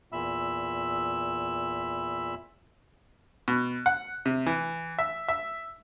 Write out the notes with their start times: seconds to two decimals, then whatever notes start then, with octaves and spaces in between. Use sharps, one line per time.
0.12 E2 A#2 E5 B5 E6
3.48 B2
3.86 F#5
4.26 C3
4.46 E3
4.98 E5
5.28 E5